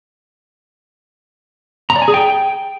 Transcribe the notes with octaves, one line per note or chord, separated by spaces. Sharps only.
A#5
D5
G#5
G#4
G5